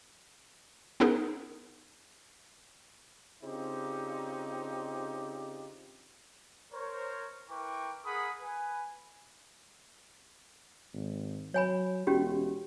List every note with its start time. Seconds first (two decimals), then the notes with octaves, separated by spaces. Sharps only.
1.00 B3 C#4 D#4 G#4 A#4
3.43 C#3 C4 D4 D#4 F4 G4
6.73 A#4 C5 C#5
7.49 E4 A#4 B4 G5 C#6 D6
8.04 G#4 A#4 F#5 B5 D#6
8.42 B4 G#5
10.94 G#1
11.54 F#3 C#5 G#5 B5
12.07 E1 C#4 F#4 G4